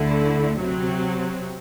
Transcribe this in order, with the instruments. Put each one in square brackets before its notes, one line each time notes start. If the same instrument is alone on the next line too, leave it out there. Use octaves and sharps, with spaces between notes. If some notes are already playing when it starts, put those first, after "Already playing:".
Already playing: [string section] D2 D3 A3 E4
C3 F#3 C4